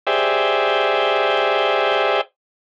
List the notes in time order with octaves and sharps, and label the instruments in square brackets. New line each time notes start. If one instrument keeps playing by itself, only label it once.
[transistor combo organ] G4 G#4 C5 D5 E5